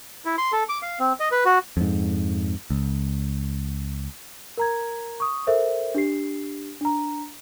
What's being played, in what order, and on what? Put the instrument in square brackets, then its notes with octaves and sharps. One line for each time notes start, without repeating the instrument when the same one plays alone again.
[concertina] E4
C6
A4
D6
F5
C4
D#5
B4
F#4
[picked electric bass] F2 G#2
C#2
[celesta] A#4 A#5 G#6
C#6 D#6
A4 A#4 C5 E5
D4 G4 C7
D4 A#5